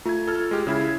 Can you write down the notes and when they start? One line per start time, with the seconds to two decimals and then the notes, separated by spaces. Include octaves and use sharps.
0.05 A3 F4 G#6
0.27 A4 F6
0.51 G#3 G4
0.67 C#3 E4 G#6